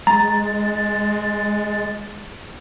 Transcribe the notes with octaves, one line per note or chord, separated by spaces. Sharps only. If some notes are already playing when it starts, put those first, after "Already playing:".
G#3 A#5 A6